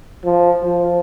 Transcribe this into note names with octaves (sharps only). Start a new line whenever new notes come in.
F3
F3